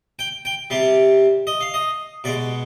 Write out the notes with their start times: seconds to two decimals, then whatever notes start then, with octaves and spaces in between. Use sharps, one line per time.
0.19 G5
0.45 G5
0.70 C3 G3 F5
1.47 D#5
1.61 F5
1.74 D#5
2.24 B2 D5
2.28 G#3